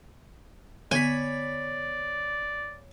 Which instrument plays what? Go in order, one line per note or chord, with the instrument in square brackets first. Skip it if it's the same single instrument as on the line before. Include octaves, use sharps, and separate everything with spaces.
[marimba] D3 B3 [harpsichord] C#5 B5 [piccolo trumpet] D5 [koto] G#5